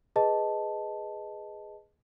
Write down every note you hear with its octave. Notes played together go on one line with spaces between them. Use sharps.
G#4 B4 D#5 A5